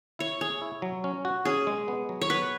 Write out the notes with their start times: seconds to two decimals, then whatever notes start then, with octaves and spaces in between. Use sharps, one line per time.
0.19 E4 C#5
0.41 G#4 C#5
0.62 E4
0.82 F#3
1.04 C#4
1.25 F#4
1.45 C#4 G#4
1.67 G#3
1.88 B3
2.09 F#3
2.21 C#5
2.30 B3 B4